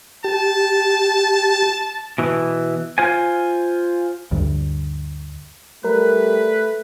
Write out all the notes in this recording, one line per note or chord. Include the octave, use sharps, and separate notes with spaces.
G4 A5
B2 E3
F4 C5 G#5
D2 G2
G3 A3 A#4 B4